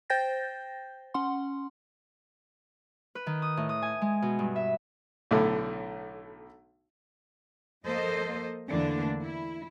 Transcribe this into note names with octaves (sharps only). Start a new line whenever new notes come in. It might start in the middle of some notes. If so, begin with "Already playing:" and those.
C5 G5 G6 A6 A#6
C#4 F#5 C6
B4
D#3
D#6
A2
D#6
G#5
G#3
B2
G2
E5
B1 A2 D3
F3 A#3 A4 C5 D#5
E2 D3 E3 A3 A#3 D4
E4